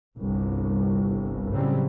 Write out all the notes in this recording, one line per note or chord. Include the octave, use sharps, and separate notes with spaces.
G1 C2
A2 C#3 F#3 G3 C4